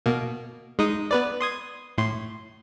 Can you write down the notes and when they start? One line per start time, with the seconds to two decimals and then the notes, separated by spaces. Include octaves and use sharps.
0.06 B2 A#3
0.79 G#3 D#4 D#6
1.11 B3 B4 D5
1.41 C6 D#6 G#6
1.98 A2 C6